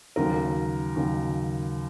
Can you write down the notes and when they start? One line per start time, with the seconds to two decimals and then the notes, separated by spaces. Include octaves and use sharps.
0.16 D#2 C#3 F#3 A#4
0.96 D#2 C#3 F#3